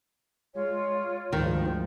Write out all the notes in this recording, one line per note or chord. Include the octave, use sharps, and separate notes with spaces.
G#3 F4 C#5
D2 G#2 D#3 F3